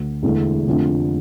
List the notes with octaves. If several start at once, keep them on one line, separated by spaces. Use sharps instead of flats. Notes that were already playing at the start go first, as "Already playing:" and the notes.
Already playing: D2
E1 E2 D3 A3 E4
F1 F2 D3 A3 D4